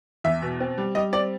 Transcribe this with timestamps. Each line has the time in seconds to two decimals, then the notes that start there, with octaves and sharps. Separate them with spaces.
0.24 E2 E5
0.42 B2
0.60 C4
0.78 G3
0.95 G3 D#5
1.13 C4 D5